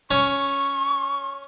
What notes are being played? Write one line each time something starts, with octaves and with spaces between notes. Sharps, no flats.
C#4 C#6